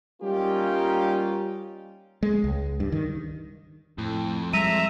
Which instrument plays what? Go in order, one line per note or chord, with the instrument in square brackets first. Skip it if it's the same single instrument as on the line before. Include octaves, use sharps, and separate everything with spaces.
[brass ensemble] G3 A#3 C#4 D#4 F4 G4
[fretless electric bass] G#3
C#2
G2
D#3
[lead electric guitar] F2 [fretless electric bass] A2
[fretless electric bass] G3 G#3 [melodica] E5 A#5 [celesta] D#7